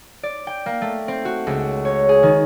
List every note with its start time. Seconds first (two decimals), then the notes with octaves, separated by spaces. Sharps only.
0.23 D5
0.47 G5
0.66 A#3
0.82 A3
1.08 C4
1.25 F#4
1.47 C#2
1.85 C#5
2.09 G#4
2.23 D#3